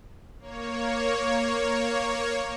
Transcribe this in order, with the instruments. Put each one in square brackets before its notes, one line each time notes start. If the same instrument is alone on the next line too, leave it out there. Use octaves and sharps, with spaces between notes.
[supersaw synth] A#3 C#5